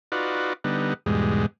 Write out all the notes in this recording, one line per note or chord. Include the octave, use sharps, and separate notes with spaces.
D#4 F4 F#4 B4 D5
D3 G3 B3 D#4
E2 G#2 B2 G3 G#3